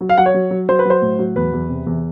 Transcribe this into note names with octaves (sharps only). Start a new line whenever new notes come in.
F#3
F5
F#3 F#5
C#5
F#3
F#3
F#3 C5
B4
F#3 C5
A2
F#3
E2 B4
E2
C3
E2